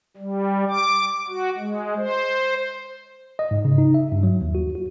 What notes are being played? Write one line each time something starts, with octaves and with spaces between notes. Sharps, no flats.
G3
D6
F#4
G#3
C5
D#5
G#2
C#3
D#4
E5
G2
F#3
D#2
F#4
F#4